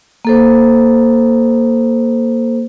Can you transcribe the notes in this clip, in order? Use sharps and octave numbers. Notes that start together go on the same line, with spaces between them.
A#3 A4 C5